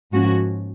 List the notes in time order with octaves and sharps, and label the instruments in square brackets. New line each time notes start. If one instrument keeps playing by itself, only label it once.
[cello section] G#2 F3 A#3 C#4 F#4